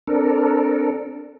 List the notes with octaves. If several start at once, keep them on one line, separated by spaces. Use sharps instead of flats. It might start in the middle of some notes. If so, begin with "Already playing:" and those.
C4 D4 A4 A#4